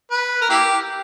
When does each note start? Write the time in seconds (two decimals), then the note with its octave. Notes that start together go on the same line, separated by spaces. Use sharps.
0.11 B4
0.41 A#4
0.50 A#3 E4 G4